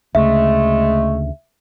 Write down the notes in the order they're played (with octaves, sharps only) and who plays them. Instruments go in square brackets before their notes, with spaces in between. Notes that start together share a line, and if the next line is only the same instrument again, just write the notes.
[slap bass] D2 C#3 [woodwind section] G#3 A3 [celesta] E5